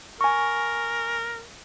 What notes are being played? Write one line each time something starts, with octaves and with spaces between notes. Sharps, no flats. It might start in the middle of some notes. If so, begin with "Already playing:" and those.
A#4 G#5 C#6